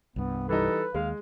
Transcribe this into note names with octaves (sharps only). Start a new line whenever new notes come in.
C2 G2 B3
E3 G3 D#4 A4 B4
D#2 G#3 F5